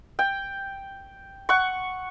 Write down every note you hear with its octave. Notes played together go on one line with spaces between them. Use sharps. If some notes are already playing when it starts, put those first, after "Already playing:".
G5
F#5 C#6